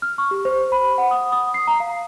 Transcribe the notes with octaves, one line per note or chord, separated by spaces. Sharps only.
F6
C#6
G4
C5
B5
F#5
D#6
D#6
C7
A#5
F5